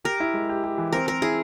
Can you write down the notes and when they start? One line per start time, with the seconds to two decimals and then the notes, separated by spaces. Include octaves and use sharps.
0.05 G4 A#4
0.20 E4
0.34 G#3
0.49 G4
0.64 G4
0.78 E3
0.93 C4 A#4
1.08 C4 A#4
1.22 E4 G#4